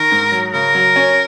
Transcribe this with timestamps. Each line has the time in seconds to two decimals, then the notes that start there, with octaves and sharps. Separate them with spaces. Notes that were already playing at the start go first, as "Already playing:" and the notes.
Already playing: D#3 A#4
0.11 G#2
0.32 F#3
0.53 C#3 A#4
0.75 F#3
0.96 C#4